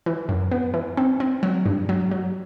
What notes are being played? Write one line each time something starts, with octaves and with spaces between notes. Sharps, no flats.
E3
F#2
B3
E3
C4
C4
F#3
G2
F#3
F#3